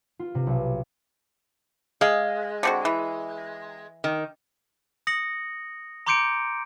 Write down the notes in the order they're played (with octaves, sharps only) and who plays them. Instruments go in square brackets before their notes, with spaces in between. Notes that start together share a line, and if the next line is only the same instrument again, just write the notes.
[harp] F4
C3
B1
[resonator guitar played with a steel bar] G#3 [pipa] G#4 F5
[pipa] D3 C4 F#4
E3
[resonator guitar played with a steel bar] D#3
[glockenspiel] D#6 A#6 C#7 F#7
A#5 C6 D6 G6 C#7 D7